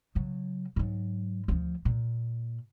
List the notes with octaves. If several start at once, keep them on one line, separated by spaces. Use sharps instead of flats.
C#3 F#3
G#2 F#3
D2 F3
A#2